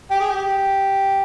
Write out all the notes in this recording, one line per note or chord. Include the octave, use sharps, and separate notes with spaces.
G4
G#4
G4